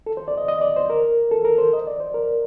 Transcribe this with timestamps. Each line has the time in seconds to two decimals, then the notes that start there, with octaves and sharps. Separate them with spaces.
0.06 A4
0.17 C5
0.28 D5
0.37 D#5
0.48 D#5
0.61 D5
0.76 C5
0.90 A#4
1.31 A4
1.45 A#4
1.58 C5
1.73 D#5
1.87 D5
2.00 C5
2.14 A#4